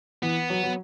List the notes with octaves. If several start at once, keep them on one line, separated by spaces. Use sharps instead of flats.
E3 B3
F#3
F#3